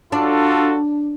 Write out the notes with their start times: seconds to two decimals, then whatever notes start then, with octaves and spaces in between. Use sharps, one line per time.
0.12 D4 F4 F#4 A4